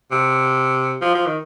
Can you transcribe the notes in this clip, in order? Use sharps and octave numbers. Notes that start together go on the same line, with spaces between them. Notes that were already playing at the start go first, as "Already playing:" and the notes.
C3
F3
F3
D#3